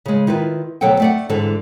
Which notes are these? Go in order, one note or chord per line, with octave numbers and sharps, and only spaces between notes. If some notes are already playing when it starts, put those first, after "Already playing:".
C#3 G#3
D#3 E4 F4 B4
D2 B2 F#3 A4 F#5 G5
A3 D5 F#5
G#2 D3 E3 A4 D5